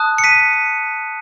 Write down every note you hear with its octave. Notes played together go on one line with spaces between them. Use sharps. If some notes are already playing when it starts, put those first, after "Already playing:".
Already playing: A5 D#6 F#6
C#7
B6 D#7